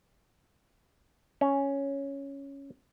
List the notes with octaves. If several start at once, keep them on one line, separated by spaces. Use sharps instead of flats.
C#4